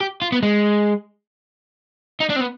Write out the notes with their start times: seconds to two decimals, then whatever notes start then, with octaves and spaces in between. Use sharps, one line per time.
0.01 G4
0.22 F4
0.32 B3
0.43 G#3
2.20 D#4
2.30 D4
2.36 C4
2.41 B3